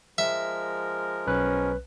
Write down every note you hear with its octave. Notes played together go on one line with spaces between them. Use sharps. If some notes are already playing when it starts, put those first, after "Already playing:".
F3 G#3 A#4 E5
B1 C#4 B4 F#6